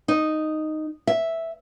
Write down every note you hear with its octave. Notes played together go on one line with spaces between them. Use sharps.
D#4
E5